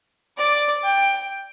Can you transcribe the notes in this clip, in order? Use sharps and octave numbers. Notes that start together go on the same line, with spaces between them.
D5
G5